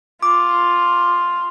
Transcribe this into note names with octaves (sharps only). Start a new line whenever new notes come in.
F4 D6